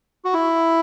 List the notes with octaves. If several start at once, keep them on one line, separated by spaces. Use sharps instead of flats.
F#4
E4